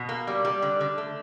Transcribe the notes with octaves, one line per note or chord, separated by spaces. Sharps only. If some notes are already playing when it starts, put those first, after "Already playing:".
Already playing: B2
A#3
G3
G3
D3
D3
A3